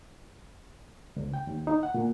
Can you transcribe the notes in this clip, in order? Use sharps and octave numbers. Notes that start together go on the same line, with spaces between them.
C#2
G5
D#2
D#4
F#5
A#2